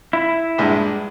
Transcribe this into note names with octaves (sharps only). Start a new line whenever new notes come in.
E4
A#1 G2 G#3